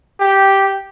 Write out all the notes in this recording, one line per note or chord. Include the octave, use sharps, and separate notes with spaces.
G4